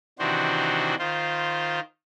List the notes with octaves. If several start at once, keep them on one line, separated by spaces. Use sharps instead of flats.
C3 D#3 E3 D4 F#4 C5
D#3 F4 C5